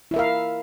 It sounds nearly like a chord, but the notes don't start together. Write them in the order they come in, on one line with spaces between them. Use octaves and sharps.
E4 E5 A#4 F5